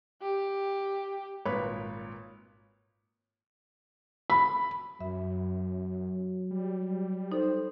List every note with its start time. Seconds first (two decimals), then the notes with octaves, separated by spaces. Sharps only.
0.22 G4
1.45 G#1 A#2 B4 C#5 B5
4.30 B5
5.00 F#2 F#3 E5
6.51 G3
7.32 D#4 A4 C5